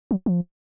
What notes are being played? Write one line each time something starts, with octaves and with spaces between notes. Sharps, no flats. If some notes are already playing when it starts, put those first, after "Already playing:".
F#3
F3